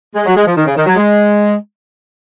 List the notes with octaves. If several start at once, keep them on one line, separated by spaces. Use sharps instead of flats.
G#3
F#3
G#3
F3
D#3
C#3
D#3
F#3
G#3